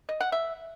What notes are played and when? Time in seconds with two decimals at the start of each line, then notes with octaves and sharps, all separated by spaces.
0.09 D#5
0.20 F#5
0.32 E5